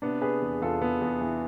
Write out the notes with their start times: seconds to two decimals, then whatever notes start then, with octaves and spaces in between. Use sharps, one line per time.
0.02 C3 B3 D4
0.22 C3 G#4 B4
0.42 E2
0.61 E2 F4 A4
0.81 E2 B3
1.01 E2
1.21 E3